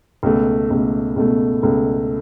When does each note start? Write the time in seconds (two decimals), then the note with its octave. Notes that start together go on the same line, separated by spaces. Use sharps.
0.23 C#2 B2 A3
0.70 C#2 B2 A3
1.16 C#2 B2 A3
1.62 C#2 B2 A3